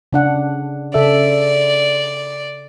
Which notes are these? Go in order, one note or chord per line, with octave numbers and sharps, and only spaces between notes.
C#3 D4 F#5
C#3 A4 D5 E5